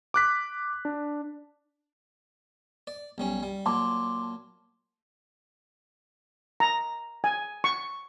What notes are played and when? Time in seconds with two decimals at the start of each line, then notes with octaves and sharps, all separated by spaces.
0.14 D6 F#6 B6
0.85 D4
2.87 D5
3.18 B1 G3 C#4
3.43 G3
3.66 A#2 F#3 A5 C6 D6
6.60 A#5
7.24 G#5
7.64 C#6